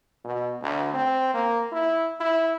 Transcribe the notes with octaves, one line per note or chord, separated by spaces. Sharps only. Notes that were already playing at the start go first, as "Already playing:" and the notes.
B2
D2
C4
A#3
E4
E4